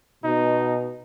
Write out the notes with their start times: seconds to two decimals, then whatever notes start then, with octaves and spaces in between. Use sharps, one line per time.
0.24 B2 D#4